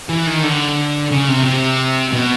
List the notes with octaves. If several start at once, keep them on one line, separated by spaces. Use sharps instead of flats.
E3
D#3
D3
C#3
C3
C3
B2